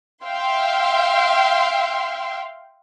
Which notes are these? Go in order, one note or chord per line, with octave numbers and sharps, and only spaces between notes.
E5 F5 G5 C6